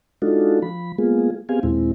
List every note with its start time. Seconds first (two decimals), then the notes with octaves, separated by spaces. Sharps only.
0.22 G#3 D4 D#4 F4 F#4 A4
0.62 F3 B5
0.98 G#3 A#3 B3 F4 G#4
1.49 B3 C4 G4 G#4 F5 G#5
1.63 D#2 A#2 G#3 C4 E4